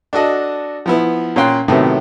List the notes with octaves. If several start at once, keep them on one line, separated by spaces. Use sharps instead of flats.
D4 F#4 A4 D#5 F#5
F3 B3 E4
A#2 C#4 F4 G5 C6 F#6
A2 C3 D#3 F#3 A3 B3